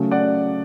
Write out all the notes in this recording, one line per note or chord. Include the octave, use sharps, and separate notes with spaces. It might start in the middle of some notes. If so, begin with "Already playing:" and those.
Already playing: C#3 F#3 A3
D5 F#5